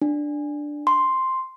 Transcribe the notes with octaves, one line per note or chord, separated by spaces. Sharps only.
D4
C6